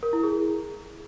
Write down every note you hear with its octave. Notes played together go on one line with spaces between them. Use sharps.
A#4
E4
G#4